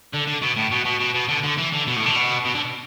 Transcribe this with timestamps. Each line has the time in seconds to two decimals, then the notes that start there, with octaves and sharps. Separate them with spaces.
0.13 D3
0.27 D3
0.42 B2
0.57 A2
0.71 B2
0.86 B2
1.00 B2
1.15 B2
1.29 D3
1.44 D3
1.58 E3
1.72 D3
1.87 B2
1.96 A2
2.06 D3
2.16 B2
2.45 B2
2.54 D3